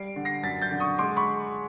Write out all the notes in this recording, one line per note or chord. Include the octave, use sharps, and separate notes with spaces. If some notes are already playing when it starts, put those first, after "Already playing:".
Already playing: G3 C7 D7
D3
A#6 C7
F#2 A6 B6
G6 A6
D3
C#6 D#6
G#3 C6 D6
B5 C#6